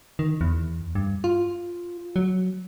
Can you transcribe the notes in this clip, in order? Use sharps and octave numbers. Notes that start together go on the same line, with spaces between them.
D#3
E2
G2
F4
F#3